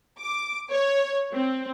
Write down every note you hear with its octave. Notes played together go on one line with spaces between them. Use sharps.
D6
C#5
C4